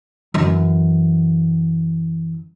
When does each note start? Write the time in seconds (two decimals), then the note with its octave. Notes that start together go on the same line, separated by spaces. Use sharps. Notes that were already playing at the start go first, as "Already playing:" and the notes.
0.34 F#2 E3